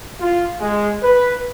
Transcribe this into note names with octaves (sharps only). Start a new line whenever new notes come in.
F4
G#3
B4